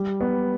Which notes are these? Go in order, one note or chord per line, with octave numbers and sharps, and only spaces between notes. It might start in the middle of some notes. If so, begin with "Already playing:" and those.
Already playing: G3
B3